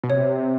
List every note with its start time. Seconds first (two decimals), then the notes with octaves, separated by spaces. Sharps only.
0.04 B2
0.10 C3 C#5